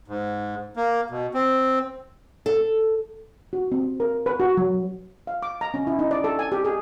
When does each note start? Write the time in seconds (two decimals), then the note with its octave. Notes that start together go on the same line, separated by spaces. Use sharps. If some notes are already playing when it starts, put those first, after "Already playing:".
0.08 G#2
0.76 A#3
1.10 B2
1.34 C4
2.46 A4
3.53 F#4
3.72 C4
4.00 A#4
4.26 B4
4.40 F#4
4.57 F#3
5.27 F5
5.43 D6
5.61 A#5
5.74 C#4
5.87 E4
5.99 D#4
6.11 D5
6.24 A4
6.39 G#5
6.52 G4
6.65 G#4